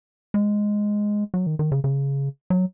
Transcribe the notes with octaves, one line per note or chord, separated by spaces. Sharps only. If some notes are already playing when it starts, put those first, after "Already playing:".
G#3
F#3
D#3
D#3
C#3
C#3
F#3